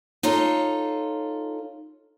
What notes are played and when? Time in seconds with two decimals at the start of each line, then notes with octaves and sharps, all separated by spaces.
0.23 D#4 F4 A4 C#5